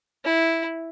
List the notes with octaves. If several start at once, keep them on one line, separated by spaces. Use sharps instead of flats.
E4